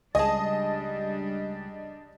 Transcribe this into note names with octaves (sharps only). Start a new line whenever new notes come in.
C#2 G3 D4 G#4 D#5 G#5 A5